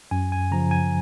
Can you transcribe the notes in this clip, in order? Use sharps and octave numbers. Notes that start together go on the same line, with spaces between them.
F#2 G#5
G#5
C#3 F3 A#5
G#5